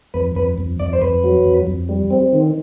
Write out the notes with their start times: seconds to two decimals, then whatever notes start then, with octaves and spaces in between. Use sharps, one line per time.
0.14 F2 B4
0.35 F2 B4
0.58 F2
0.79 F2 D5
0.93 C5
1.01 F2 B4
1.24 F#3
1.45 F2
1.67 F2
1.89 G3
2.10 C4
2.33 D#3